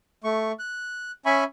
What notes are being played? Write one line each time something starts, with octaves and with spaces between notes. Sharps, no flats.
A3 C#6
F#6
C#4 E5 G#5 B5 C#6